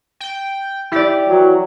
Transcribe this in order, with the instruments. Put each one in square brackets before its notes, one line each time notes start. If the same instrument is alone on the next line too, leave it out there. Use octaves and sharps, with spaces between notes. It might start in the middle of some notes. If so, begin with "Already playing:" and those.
[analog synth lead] G5
[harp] E4 D5 [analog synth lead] G4
[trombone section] E3 F#3